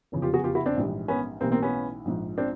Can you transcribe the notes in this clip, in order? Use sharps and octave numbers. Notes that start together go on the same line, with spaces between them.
F1 E2 C#3 F3
F4 G4
F#4 G#4
F4 G4
E4 F#4
C4 D4
A#1 G#2 E3 G3
B3 C#4
B1 A2 E3 G3 A#3 C4
A#3 C4
B3 C#4
A#1 G#2 F3
C4 D4